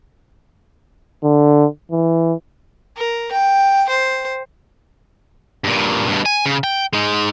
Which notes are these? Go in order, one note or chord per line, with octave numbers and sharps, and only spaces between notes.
D3
E3
A#4
G5
C5
G2 A#2
G2 B2
G#5
C#3
G5
G#3 D#4